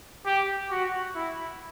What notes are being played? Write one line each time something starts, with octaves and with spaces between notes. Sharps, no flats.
G4
F#4
E4